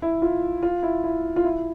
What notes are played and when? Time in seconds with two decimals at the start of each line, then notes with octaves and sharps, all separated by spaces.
0.02 E4
0.22 F4
0.63 F4
0.83 E4
1.04 E4
1.36 F4
1.44 E4